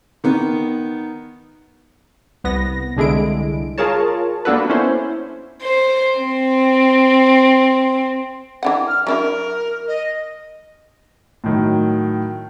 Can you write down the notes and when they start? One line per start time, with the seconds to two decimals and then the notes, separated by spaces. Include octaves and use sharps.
0.24 D#3 B3
2.44 C2 B3 A#6
2.96 C2 D3 G#3 E4 D7
3.78 F4 G#4 A#4 C#5 A5
4.45 A#3 B3 D4 F#4 A4 B4
4.70 C#4 E4 C5
5.62 C5
6.19 C4
8.63 E3 D4 F#5
8.87 F6
9.07 F#3 D4 E4 A#4
9.88 D#5
11.44 A2 D#3 F#3